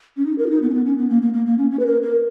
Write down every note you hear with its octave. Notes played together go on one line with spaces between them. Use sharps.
C#4
D#4
A#4
F4
D#4
B3
C#4
B3
C#4
B3
A#3
A#3
A#3
A#3
C#4
C#4
B4
A#4
A#4